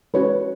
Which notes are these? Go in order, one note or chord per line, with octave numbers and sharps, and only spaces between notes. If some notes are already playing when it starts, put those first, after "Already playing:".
G#3 C#4 F#4 B4 C#5